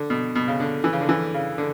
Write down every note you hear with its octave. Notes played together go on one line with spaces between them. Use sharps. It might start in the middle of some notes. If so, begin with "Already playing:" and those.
Already playing: D3
B2
B2
C#3
D3
E3
C#3
D3
E3
C#3
D3